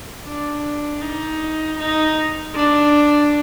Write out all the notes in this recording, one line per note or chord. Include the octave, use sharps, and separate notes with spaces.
D4
D#4
D#4
D4